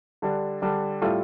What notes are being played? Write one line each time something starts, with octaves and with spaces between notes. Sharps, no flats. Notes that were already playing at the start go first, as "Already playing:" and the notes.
D3 G3 D4
D3 G3 D4
A2 G3 F4 A4